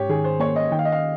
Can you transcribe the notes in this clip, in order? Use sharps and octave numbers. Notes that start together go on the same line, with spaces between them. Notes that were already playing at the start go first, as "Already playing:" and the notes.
Already playing: G#2 G4 C#5
D#3 G#4
C5
A#3 C#5
D#5
D#3 G5
F5
D#5
F5